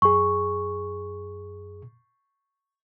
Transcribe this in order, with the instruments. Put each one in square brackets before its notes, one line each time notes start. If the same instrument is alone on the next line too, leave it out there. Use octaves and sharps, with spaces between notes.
[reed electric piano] F#2 G#4 [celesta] C#6